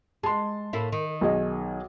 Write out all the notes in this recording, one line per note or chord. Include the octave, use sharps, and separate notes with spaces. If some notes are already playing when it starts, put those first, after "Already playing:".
G#3 A5 C6
A2 A#3 E4
D#3
B1 G#4 D#5